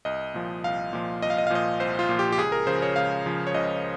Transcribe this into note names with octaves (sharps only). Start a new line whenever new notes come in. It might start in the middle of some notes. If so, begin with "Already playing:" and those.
C2 D#5
A#2 F3
C2 F5
A#2 F3
C2 D#5
F5
D#5
F5
A#2 F3 D#5
C2 C5
F4
A#2 F3
G4
G4
C#2 G#4
A#4
C#3 F3 C5
C#5
C#2 F5
C#3 F3
C#5
C#2 D#5